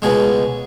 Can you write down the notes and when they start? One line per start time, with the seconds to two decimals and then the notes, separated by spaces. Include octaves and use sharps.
0.02 C#2 B2 G#3 G#4